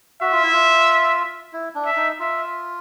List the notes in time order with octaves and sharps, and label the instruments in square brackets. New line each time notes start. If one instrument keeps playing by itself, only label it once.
[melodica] F#4 [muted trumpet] E5
[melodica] F4
E4
F4
E4
D4
[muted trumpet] E5
[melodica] D#4
[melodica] F4 [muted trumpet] E5